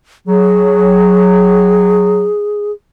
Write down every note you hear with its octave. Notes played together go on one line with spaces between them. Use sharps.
F#3 G#4